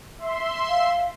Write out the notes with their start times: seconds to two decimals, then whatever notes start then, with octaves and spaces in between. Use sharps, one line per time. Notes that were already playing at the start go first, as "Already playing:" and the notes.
0.18 E5 C6
0.69 F5